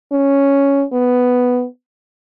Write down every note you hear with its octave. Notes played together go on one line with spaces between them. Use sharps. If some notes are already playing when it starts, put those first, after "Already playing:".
C#4
B3